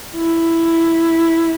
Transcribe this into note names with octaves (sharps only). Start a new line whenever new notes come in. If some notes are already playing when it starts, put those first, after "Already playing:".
E4